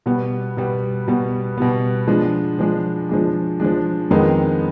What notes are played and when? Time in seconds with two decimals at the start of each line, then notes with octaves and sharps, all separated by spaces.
0.06 B2 G3 B3
0.57 B2 G3 B3
1.08 B2 G3 B3
1.58 B2 G3 B3
2.08 F3 G#3 D4
2.59 F3 G#3 D4
3.09 F3 G#3 D4
3.60 F3 G#3 D4
4.11 F2 D#3 G#3 B3 D#4